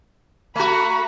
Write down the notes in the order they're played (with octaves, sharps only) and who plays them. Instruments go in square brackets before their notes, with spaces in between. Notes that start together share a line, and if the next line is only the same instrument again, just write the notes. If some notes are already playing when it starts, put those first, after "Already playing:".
[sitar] A3 F#4 [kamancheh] A#5 B5